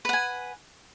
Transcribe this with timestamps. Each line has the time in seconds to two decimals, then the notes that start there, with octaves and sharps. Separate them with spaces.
0.05 B4
0.09 F#5
0.13 G#5